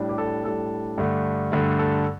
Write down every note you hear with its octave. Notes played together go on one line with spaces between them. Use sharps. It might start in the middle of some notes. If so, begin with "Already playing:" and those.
Already playing: A2 G3 D4
G4
A4
A2 G3 D4 A4
G2 D3 A3
G2 D3 A3
A4